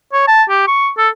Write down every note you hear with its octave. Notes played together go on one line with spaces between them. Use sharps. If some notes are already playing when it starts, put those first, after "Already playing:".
C#5
A5
G4
C#6
A4